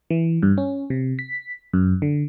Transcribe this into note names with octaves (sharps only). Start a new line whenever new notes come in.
E3
G2
C#4
C3
B6
F#2
D3